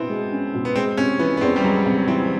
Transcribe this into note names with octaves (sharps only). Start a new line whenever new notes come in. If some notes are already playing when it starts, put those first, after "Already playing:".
Already playing: B2 B3 C4 E4
G#3
C#4
B2
B3
G#3 C4
C3 C#4
E3 B3
B3
E2 C4
G3
F#3 G#3
C3
E3 C4